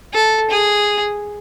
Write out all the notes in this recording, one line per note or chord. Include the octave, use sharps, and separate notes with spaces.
A4
G#4